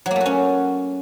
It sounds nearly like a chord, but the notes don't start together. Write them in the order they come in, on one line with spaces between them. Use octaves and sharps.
F#3 A#3 A3 F#4 C#4